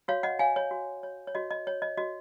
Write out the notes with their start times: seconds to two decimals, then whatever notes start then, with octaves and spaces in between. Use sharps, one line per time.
0.08 F#4 C#5 F5
0.23 D#5 F#5
0.39 C#5 F5 G#5
0.56 C#5
0.71 F#4
1.03 C#5
1.27 C#5
1.35 F#4 D#5
1.51 D#5
1.67 C#5
1.82 D#5
1.97 F#4 D#5